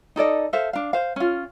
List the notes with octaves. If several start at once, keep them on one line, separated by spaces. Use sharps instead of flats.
D#4 A4 D5 D#5
A4 C5 E5 F5
D4 F5
C5 F5
C#4 F4